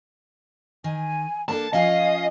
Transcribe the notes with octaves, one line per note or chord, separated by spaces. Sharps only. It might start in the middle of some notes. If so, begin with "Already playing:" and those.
D#3 G#5
A#3 D4 A4 A5
F3 C#4 F4 D#5 F5 G#5